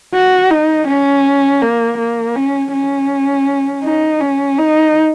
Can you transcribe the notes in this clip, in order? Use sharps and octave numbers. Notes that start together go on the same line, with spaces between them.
F#4
D#4
C#4
A#3
A#3
C#4
C#4
D#4
C#4
D#4